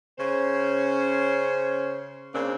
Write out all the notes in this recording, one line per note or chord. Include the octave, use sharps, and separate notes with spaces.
C#3 C#4 C5
C#3 A#3 C4 D4